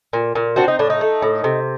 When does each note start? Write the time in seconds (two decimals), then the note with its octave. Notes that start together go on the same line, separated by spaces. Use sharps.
0.13 A#2
0.35 A#2
0.56 C4 D4 F#4
0.68 D#4
0.79 A2 D4
0.90 D#4
1.01 A3
1.22 A2
1.44 C3